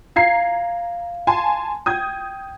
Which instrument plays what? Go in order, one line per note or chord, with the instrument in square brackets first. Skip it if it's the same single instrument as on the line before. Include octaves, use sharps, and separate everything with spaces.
[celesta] F5 [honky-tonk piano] A#5 G#6 C7
[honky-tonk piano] G#5 A5 C6
[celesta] G5 [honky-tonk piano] D#6 G6 G#6